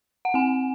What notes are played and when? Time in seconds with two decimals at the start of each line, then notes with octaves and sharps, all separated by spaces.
0.25 F#5
0.34 C4 G#5